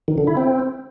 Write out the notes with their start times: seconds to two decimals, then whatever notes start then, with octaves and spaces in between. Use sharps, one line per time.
0.08 D#3
0.18 D3
0.27 E4
0.37 C4